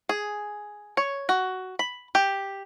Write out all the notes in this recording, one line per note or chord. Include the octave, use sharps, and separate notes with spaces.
G#4
C#5
F#4
B5
G4